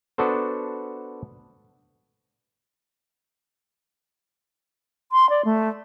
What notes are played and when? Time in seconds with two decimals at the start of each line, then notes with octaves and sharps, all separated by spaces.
0.18 B3 D4 F#4 A4 C5
5.12 C6
5.30 D5
5.45 A3